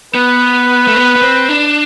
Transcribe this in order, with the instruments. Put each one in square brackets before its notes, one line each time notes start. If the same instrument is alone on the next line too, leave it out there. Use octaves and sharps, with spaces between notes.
[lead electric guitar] B3 [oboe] B4
[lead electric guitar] A3
B3
B3
C4
D4